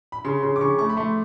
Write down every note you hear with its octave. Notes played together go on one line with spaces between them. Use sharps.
B5
C#3 C6
C#3 C6
D6
C#3 C#6
A3 C#6
B5
A3 C6